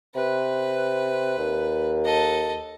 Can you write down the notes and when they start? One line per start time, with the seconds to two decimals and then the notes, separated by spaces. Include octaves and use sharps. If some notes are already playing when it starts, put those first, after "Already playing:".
0.15 C3 B4
1.38 D#2
2.05 A4 D#5